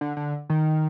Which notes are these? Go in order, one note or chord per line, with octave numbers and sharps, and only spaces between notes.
D3
D3
D#3